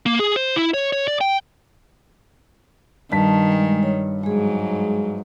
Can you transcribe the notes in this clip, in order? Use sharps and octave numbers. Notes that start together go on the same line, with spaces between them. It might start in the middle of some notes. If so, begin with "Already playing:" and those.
A#3
G#4
C5
E4
C#5
C#5
D5
G5
G2 D#3 A5 B6
G#3
C#5
G#2 F#3 G#3 G#4